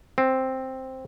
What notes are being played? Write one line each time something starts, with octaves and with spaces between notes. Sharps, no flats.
C4